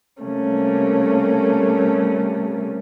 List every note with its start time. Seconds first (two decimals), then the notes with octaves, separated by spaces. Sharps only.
0.23 C3 G3 A3 A#3 C#4